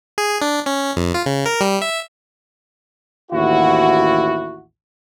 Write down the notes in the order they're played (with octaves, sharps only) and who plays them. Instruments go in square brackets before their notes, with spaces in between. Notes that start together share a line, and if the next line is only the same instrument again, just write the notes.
[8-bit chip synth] G#4
D4
C#4
F2
F4
C#3
A#4
G3
E5
[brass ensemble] A1 D#2 E4 F#4